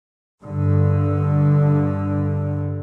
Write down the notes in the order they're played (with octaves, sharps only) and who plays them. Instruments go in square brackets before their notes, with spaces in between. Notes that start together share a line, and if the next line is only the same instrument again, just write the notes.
[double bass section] G2 D3